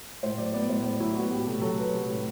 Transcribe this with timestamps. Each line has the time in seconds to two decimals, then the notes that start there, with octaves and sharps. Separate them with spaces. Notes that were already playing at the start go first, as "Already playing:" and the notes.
0.23 A2 C5
0.38 F#3 D5
0.53 B3 D5
0.69 A2 C5
0.84 A2 D5
1.00 F#3 E4
1.15 B3 F#4
1.31 A2 G4
1.46 C3 A4
1.62 F#3 A4
1.77 A3 B4
1.94 C3
2.09 A2